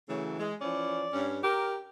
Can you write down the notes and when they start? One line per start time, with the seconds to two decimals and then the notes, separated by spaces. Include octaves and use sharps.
0.09 C#3 E3 F#3 A3
0.39 G#3
0.61 E3 F3 C#4 D5
1.13 G2 C#4
1.44 G4 A#4